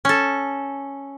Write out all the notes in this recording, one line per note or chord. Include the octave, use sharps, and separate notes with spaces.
C#4 A4